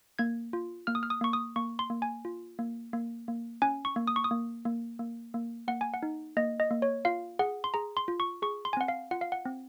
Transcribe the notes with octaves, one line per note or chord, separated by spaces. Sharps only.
A#3 G#6
F4
A#3 F6
D#6
F6
D#6
A#3 C#6
D#6
A#3 C#6
C6
A#3
G#5
F4
A#3
A#3
A#3
C#4 G#5
C#6
A#3
D#6
C#6
D#6
A#3
A#3
A#3
A#3
A#3 F#5
G#5
F#5
D#4
A#3 D#5
D#5
A#3
C#5
F4 F5
G#4 F#5
C6
G#4 A#5
C6
F4
C#6
G#4 C#6
C6
G#5
C4 F#5
F5
F4 F#5
F5
F#5
C4